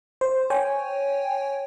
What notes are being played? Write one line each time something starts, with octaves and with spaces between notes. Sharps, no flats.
C5
C#5 G5 G#5